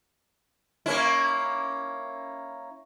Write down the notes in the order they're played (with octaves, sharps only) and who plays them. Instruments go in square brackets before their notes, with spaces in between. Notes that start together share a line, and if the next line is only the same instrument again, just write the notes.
[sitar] A#3 C#4 E4